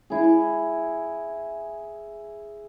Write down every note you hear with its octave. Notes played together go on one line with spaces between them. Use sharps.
E4 G#4